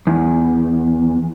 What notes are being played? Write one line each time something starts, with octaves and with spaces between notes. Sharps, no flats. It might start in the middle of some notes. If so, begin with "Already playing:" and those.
E2